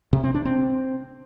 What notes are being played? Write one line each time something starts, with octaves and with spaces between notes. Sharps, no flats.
C3
C4
D4
C4